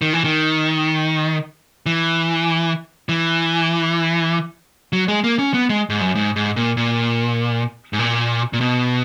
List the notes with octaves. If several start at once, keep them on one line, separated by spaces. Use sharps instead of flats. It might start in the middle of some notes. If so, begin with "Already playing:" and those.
D#3
E3
D#3
E3
E3
F#3
G#3
A#3
C#4
B3
G#3
G#2
F#2
G#2
G#2
A#2
A#2
G#2
A#2
A#2
B2